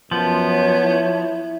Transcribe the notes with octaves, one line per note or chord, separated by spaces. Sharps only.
F#2 F3 B3
C#5
E4